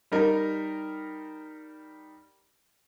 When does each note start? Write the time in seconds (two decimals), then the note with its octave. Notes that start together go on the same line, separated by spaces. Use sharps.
0.12 G3 D#4 A#4